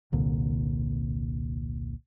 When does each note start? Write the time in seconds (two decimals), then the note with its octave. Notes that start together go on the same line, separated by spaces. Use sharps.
0.12 E1 C2 A#2 D3